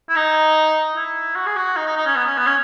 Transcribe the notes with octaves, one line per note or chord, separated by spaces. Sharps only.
E4
D#4
E4
F#4
G#4
F#4
D#4
D#4
D#4
C#4
B3
C#4
B3
C#4